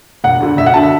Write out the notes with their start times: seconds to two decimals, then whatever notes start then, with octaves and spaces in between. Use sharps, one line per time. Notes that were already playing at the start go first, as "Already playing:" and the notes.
0.24 E1 F#5
0.40 D2 D3
0.57 E1 E5
0.66 F#5
0.74 D2 D3 A5
0.83 E5